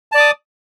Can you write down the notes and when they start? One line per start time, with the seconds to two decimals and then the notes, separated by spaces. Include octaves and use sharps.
0.12 A5
0.15 D5
0.17 D6
0.20 D#6